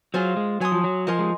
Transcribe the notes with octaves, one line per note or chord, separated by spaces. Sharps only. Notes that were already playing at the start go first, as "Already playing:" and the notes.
F#3 F4 G#4 C5 F5
G#3
F#3 C#5 G#5 C6 D#6
F3
F#3
F3 A#4 D#5 G#5 C6
G#3